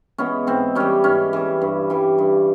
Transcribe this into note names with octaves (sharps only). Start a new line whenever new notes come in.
E3 G#3 B3 C#4
G#2 C4
E3 G3 C#4
G#2 C#4
E3 G3
G2
E3 G3
G2